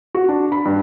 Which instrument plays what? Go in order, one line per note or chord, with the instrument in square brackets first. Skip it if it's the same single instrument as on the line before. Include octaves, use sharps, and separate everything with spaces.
[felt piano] F#4
D4
B5
G2